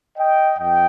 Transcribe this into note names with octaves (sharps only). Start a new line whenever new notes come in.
D#5 G5
F2 D#5 G5